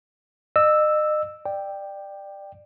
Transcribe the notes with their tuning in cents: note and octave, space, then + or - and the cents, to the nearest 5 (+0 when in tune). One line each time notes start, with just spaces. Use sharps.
D#5 -35 E6 +0
D5 +20 G5 +5